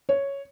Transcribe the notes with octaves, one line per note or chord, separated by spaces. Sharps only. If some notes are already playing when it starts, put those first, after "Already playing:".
C#5